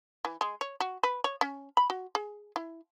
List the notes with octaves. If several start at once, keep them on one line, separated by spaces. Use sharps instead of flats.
E3
G#3
C#5
F#4
B4
C#5
C#4
B5
F#4
G#4
E4